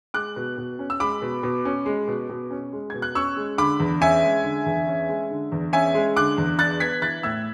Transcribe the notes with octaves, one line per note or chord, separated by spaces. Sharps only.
G#3 D6 F#6
B2
B2
C#4
E6
G#3 B5 D6
B2
B2
C#4
G#3
B2
B2
C#4
G#3
B2 G#6
F#6
C#4 C#6 E6
G#3
D3 B5 D6
E2
C#4 E5 G#5
G#3
D3
E2
C#4
G#3
D3
E2
C#4 E5 G#5
G#3
D3 D6 F#6
E2
D4 F#6 A6
B3 G#6 B6
E3 F#6 A6
A2 E6 G#6